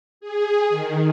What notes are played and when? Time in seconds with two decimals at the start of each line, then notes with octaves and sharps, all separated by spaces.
0.21 G#4
0.70 D#3